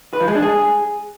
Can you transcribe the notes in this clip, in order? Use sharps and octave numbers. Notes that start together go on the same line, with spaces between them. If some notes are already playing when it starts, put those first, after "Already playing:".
B4
F3
G#3
D4
G#4